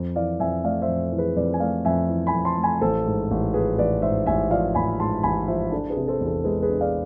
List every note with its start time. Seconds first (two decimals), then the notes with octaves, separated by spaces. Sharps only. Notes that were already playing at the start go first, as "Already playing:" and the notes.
Already playing: F2
0.16 E3 D5 F5
0.40 F2 E5 G#5
0.64 A3 D5 F5
0.82 C5 E5
0.88 F2
1.12 E3
1.18 G#4 B4
1.36 F2 B4 D5
1.54 G#5
1.60 A3 D5 F5
1.85 F2 E5 G#5
2.09 E3
2.27 G#5 B5
2.33 F2
2.45 A5 C6
2.57 A3
2.64 G#5 B5
2.81 A1 A4 C5
3.06 G#2
3.31 A1
3.54 F3 G#4 B4
3.78 A1 B4 D5
4.02 G#2 C5 E5
4.26 A1 E5 G#5
4.51 F3 D5 F5
4.75 A1 G#5 B5
4.99 G#2 A5 C6
5.23 A1 G#5 B5
5.48 F3 C5 E5
5.72 D4 A4
5.90 G#4 B4
5.97 C3
6.08 A4 C5
6.20 E2
6.27 A4
6.44 G#3 G#4 B4
6.62 G#4 B4
6.69 D4
6.81 D5 F5